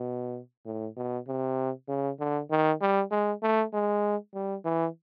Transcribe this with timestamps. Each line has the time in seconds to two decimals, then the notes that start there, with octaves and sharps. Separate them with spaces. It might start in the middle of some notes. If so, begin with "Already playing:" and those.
Already playing: B2
0.66 A2
0.97 B2
1.28 C3
1.88 C#3
2.20 D3
2.51 D#3
2.81 G3
3.11 G#3
3.43 A3
3.73 G#3
4.34 G3
4.65 E3